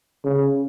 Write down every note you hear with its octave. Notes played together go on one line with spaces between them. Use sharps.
C#3